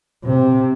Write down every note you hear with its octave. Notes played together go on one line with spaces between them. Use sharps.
C3